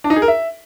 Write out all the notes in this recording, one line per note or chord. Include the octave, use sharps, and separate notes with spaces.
D4
D#4
G#4
A#4
E5